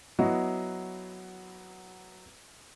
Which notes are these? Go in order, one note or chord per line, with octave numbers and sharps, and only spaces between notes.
F#3 B3 E4 F#4 D#5